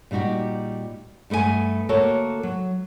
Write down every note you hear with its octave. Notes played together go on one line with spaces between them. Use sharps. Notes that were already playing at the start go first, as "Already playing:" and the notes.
A#2 G3 D#4 F#4 G4
G2 A3 B3 C5 G#5
D2 A#3 F#4 A4 A#4 C#5
F#3